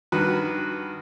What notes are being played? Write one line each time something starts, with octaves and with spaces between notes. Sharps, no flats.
G2 D#3 F#4 B4